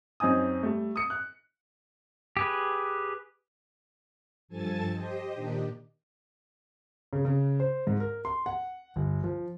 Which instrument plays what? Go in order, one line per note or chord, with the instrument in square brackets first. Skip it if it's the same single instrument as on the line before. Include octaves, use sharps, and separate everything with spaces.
[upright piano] F#2 C4 D#4 G#5 D#6
G3 A3
D#6 C#7
F#6
[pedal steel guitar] G4 G#4 B4
[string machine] G2 F3 A4 G#5 A5 A6
G4 C5 D#5
A#2 D#3 D4 D#4 G4
[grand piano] C#3
C#3
C5
G#2
A#4
C6
F#5
G1
F3